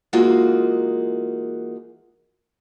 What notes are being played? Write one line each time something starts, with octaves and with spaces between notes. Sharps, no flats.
E3 G#3 A#3 D#4 F4 F#4